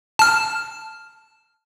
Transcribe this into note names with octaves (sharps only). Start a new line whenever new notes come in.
A5 F6